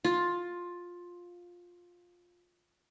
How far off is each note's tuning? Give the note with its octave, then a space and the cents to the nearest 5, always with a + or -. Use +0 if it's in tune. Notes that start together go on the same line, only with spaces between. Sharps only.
F4 +10